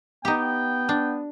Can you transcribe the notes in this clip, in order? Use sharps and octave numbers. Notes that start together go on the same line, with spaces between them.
B3 D#4 G4 G5
D4